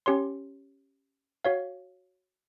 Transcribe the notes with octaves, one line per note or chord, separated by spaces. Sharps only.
C#4 G4 C#5 C6
F#4 C#5 F5